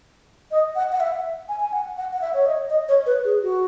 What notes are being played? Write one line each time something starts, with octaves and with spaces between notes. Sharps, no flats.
D#5
F#5
F#5
E5
G#5
G#5
F#5
F#5
F#5
E5
C#5
D#5
D#5
C#5
B4
G#4
F#4